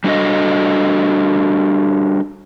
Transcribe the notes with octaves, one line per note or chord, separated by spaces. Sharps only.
G3 D4 F#4 A4 D#5